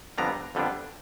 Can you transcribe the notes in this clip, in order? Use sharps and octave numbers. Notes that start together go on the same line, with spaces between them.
F2 D3 G3 B3 D4 A#5
F2 D3 G3 B3 D4